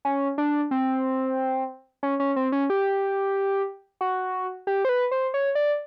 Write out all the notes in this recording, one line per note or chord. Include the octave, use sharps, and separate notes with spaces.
C#4
D4
C4
C#4
C#4
C4
C#4
G4
F#4
G4
C5
B4
C5
C#5
D5